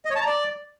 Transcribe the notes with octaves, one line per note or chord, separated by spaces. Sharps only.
D#5
C#5
A5
A#5
D5